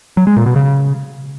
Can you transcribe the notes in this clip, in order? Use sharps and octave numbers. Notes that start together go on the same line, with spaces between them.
F#3
G#3
A#2
B2
C#3